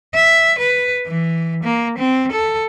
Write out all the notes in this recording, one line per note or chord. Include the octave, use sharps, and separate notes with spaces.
E5
B4
E3
A#3
C4
A4